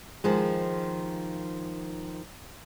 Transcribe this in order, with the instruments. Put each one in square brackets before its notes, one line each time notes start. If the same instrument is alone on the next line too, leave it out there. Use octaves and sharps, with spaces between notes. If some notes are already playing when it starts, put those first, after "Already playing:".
[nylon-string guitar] D#3 F3 G#3